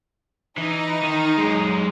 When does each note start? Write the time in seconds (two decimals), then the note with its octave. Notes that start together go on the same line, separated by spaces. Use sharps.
0.58 E3 D#4
1.04 D#3
1.38 F#2 G#3